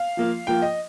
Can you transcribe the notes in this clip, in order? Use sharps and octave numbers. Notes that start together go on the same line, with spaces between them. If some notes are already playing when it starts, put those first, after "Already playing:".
Already playing: F5
F3 A#3 F4
F3 A#3 F4 G5
D#5